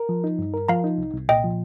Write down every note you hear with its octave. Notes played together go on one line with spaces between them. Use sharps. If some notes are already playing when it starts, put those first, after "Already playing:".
Already playing: A#4
F3
D#4
G2
A#4
F3 F5 A#5
D#4
C2
C2
A#2 D#5 G5
F3